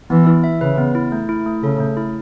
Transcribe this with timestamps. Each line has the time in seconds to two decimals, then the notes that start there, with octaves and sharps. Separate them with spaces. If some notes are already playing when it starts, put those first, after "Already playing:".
0.10 E3 B3
0.27 E4
0.44 E5
0.61 C#3 B4
0.78 B3
0.95 E4
1.12 A3
1.29 E4
1.46 A3
1.63 C#3 A4
1.80 A3
1.97 E4